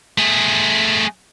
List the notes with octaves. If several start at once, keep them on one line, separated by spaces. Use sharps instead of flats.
A3 G#4